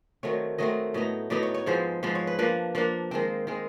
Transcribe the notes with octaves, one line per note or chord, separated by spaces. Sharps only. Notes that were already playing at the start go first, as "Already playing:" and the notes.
D#3 F#3 A3 C4 C#5
D#3 F#3 A3 C4 D#5
A2 F#3 B3 D#4
A2 F#3 B3 D#4 D5
C#5
C#5
G#2 F3 G#3 B3 C5
G#2 F3 G#3 B3 C5
C#5
B4
F3 A#3 D4 B4
F3 A#3 D4
D#3 G#3 C4 C5
D#3 G#3 C4